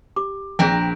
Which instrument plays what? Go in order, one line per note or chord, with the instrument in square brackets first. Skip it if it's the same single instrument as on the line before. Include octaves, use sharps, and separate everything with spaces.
[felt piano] G4 [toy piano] D6
[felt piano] A#1 [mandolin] C4 A#4 B4 [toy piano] D4 G#4